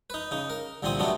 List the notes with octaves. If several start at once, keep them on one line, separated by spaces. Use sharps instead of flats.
D#4 B4
C#3 D#4
A#4
C2 A#2 D3 C4 C6 D#6
C3 F#3 G#3 A3 B3 D4